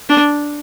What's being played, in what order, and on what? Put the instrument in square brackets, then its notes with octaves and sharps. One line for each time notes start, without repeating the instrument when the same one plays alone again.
[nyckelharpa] D4